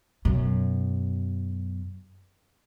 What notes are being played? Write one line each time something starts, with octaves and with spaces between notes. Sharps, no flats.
F#2 B2